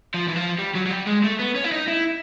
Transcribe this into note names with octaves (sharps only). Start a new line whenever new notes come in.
F3
E3
F3
G3
F#3
F#3
G3
G#3
A3
B3
C#4
E4
D#4
E4